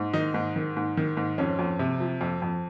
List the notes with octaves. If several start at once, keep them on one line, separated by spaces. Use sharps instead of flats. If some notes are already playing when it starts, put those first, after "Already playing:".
Already playing: G#2
D#3 D#4
G#2
D#3
G#2
D#3
G#2
F2 C#4
F2
C3
F3
F2
F2